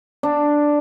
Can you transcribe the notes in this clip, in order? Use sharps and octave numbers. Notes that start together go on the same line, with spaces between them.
D4